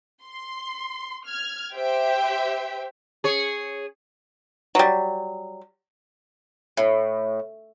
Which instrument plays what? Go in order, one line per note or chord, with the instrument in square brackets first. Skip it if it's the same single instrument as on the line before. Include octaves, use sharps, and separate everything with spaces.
[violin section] C6
F6 G#6
G4 C5 E5 G5
[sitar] G#4 C#5
[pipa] F#3 G3
[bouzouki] A2